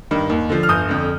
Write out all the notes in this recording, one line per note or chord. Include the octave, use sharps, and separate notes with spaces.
G2 D#3
D#2
D3 F3
F6
G1 D#6 G6
F2 D3